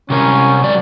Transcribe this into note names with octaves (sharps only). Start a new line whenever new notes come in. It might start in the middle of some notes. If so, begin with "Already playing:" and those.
C3 C#4 A#4
F#3 D5